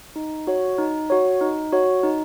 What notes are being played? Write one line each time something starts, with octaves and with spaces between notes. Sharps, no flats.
D#4
F#4 C#5
D#4
F#4 C#5
D#4
F#4 C#5
D#4